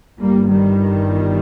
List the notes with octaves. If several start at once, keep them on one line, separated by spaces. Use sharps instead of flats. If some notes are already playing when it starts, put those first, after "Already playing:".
G1 G2 G3 A#3
D#3 G3